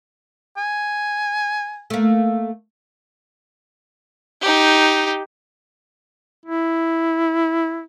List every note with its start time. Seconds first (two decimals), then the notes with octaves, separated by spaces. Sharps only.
0.57 G#5
1.90 A3 A#3
4.42 D#4 G4
6.46 E4